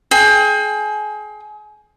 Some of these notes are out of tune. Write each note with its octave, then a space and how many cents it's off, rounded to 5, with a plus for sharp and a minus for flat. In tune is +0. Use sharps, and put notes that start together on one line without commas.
G#4 +30 G5 +30